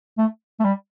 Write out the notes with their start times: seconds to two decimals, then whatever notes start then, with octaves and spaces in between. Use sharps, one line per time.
0.18 A3
0.60 A3
0.65 G3